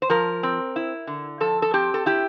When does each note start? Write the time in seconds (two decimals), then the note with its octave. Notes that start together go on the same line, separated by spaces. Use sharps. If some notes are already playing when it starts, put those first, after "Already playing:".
0.02 C5
0.10 F3 A#4
0.43 C4
0.76 E4
1.07 D3
1.40 F3 A4
1.62 A4
1.73 C4 G4
1.94 A4
2.06 E4 G4